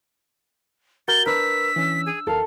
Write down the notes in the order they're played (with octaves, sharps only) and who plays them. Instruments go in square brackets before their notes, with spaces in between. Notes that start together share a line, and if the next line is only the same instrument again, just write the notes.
[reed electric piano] F#4 A#4 [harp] G6 [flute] A6 [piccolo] G7
[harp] D4 [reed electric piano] A#4 B4 [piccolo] E6 [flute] B6
[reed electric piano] E3 C#4
[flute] G#4
[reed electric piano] D#2 A#4 [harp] A4 [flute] F5